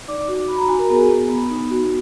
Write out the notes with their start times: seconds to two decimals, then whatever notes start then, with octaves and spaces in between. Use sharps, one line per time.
0.08 D#4 D5 D6
0.28 F#4
0.48 F#4 B5
0.58 A#5
0.68 F#4 G#5
0.78 A#4 A#5
0.89 B3 G#4 G#5
1.10 B3
1.30 B3
1.50 D#4
1.70 F#4